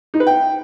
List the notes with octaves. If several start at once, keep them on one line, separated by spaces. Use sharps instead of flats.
D#4
B4
G5